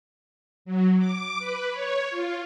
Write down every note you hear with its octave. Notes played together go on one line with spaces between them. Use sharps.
F#3
D6
B4
C#5
F4